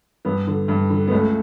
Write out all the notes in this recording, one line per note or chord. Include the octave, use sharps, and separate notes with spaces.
G2 B3
D3
G2
D3
B3
C#2 A3